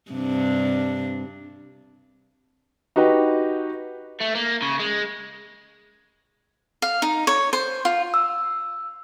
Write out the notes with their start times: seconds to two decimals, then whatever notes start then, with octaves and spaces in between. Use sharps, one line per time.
0.11 G2 C3 D4
2.96 D#4 F#4 G4 B4
4.21 A3
4.35 A#3
4.62 C#3
4.79 G#3
6.82 F5
7.02 D#4
7.27 C#5
7.53 C5
7.85 F4
8.14 E6